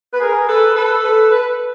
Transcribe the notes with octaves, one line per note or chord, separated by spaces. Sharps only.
B4
G#4 A#4
A4 B4
A4 B4
A4 B4
B4